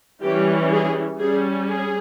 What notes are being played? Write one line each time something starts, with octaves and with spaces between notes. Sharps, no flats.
E3 G3 C#4 G4
G#4
G3 C#4 G#4
G#4